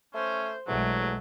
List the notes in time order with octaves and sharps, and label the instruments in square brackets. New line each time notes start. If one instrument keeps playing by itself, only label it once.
[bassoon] A3 [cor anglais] C#4 [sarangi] C5
[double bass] B1 G#3 [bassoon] E2 [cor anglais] F#3 [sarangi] A3